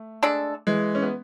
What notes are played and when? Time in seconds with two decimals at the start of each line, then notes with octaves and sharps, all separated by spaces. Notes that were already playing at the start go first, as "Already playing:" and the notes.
Already playing: A3
0.23 G#3 D4 A4
0.67 E3 G#3
0.95 C#4
1.03 B3